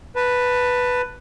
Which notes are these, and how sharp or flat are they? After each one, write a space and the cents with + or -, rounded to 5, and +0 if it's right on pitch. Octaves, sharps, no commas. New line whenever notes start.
B4 +0 A5 +20